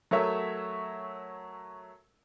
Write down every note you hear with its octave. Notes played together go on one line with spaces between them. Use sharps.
F#3 A3 A#4 C#5 E5